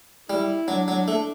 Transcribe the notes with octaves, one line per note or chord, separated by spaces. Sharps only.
G3 E4
F#3 D4
F#3
A3